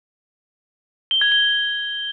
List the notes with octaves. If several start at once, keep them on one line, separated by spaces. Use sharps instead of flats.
G7
G#6
G7